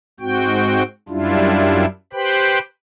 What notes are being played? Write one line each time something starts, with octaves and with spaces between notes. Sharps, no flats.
G#2 C4 F#4 G5
F#2 G3 D4 E4 F4
G4 B4 C5 G5 B5